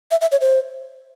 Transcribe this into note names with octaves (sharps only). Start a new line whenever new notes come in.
E5
E5
C#5
C5